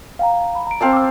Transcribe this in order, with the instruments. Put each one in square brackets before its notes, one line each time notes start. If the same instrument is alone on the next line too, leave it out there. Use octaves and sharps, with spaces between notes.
[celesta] F5 G5 A#5
B5
A#5 D7
[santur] C4 F5 A5
[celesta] D6 E6